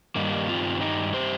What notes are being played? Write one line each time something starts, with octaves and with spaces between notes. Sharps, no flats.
G2 D#3 G3 A#3 D#4
C4 F4
D#4 G4
G4 C5